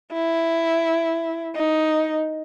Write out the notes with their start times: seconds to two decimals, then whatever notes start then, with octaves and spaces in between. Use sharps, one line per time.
0.13 E4
1.55 D#4